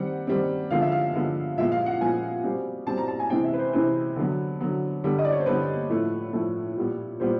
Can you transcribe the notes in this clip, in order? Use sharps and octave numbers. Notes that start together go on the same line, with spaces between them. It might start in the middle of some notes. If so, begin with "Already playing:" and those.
Already playing: D#3 G3 C4 F#5
D#3 G3 C4
D3 F3 G#3 B3 F5
E5
F5
D3 F3 G#3 B3
A#2 F3 G#3 B3 E5
F5
F#5
A#2 F3 G#3 B3 G#5
B2 G3 C4
B2 G3 C4 A5
A#5
A5
G#5
C3 E3 G#3 C4 G5
E5
B4
C5
C3 E3 G#3 C4 B4
D3 F#3 B3
D3 F#3 B3
D3 G3 B3
D#5
D5
C#5
C5
D3 G3 B3 B4
A2 F3 A3
A2 F3 A3
A#2 G3 B3
A#2 G3 B3 C5